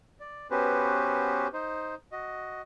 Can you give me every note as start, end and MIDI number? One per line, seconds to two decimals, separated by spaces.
0.20 0.47 74
0.51 1.47 59
0.51 1.47 61
0.51 1.47 66
0.51 1.47 67
0.51 1.47 71
0.51 1.47 72
1.53 1.95 63
1.53 1.95 72
2.12 2.61 66
2.12 2.61 75